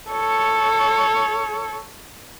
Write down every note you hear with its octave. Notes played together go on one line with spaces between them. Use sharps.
A4 C#5